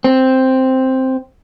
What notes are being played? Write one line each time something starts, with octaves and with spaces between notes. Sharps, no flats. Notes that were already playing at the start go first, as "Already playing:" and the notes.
C4